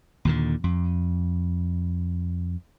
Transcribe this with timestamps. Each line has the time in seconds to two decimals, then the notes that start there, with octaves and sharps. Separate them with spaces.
0.25 D#2 A#2 D3
0.64 F2